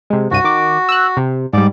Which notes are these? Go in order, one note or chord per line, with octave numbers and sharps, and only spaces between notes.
C3 G#3
C2 G2 F#4 D#7
D#3 D6
E6 F#6
C3
G#2 G3 D5